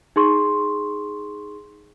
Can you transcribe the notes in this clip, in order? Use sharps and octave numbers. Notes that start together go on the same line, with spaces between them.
D#4 G#4 C6 C#6